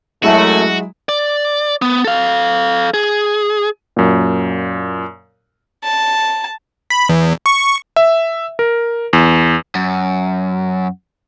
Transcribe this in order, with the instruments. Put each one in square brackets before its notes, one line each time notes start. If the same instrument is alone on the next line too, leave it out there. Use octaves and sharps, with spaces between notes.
[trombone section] F#2 A3 [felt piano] F#3 G#3 E4 [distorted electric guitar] F#4
[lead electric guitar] D5
B3
A4 F5
G#4
[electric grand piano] F#2 A#2
[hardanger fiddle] A5
[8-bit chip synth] B5
E2
C#6
[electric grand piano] E5
A#4
E2
[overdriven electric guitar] F#2